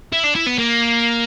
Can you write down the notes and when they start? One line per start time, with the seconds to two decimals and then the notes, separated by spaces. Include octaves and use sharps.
0.13 E4
0.24 D4
0.35 E4
0.46 B3
0.58 A#3